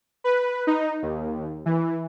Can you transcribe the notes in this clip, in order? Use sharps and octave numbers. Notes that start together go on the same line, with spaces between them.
B4
D#4
D#2
E3